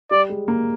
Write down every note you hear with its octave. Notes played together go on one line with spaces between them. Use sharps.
G3 D5
G#3
A#3